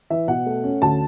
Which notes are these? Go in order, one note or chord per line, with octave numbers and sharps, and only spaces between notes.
E3 E5
B2 F#5
A3
C#4
D2 A5